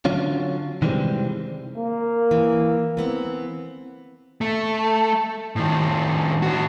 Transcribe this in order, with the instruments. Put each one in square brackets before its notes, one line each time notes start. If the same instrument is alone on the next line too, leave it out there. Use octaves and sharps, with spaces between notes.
[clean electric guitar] D3 F#3 C#4 F4
C3 D#3 E3 G3 G#3 C4
[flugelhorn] A#3
[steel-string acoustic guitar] E3
E3 B3 C4
[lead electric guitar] A3
A2 D#3
A2 F#4